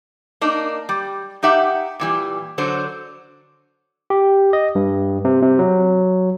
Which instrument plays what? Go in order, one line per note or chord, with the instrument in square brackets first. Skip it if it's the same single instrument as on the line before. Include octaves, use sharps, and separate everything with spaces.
[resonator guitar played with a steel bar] A#3 D4 D#4
G3
D#4 G4 E5 F#5
A#2 E3 G3
D3 F#3 F#4 C5
[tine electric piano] G4
D#5
G2
C3
C3
F#3